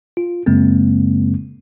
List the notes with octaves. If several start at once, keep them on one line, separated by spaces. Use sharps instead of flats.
F4
F#2 C#3 G#3 A#3 C4